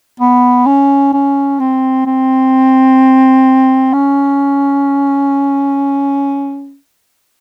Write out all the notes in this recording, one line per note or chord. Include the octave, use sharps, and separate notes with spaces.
B3
C#4
C#4
C4
C4
C#4